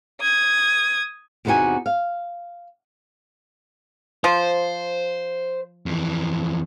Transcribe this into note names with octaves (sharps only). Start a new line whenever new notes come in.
D#6 G#6
E2 C3 B3 D#4 F#4 G#5
F5
F3 C5
F2 E3